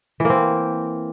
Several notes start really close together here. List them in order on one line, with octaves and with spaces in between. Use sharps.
E3 A#3 C4